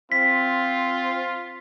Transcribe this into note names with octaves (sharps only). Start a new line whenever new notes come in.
C4 F4 B6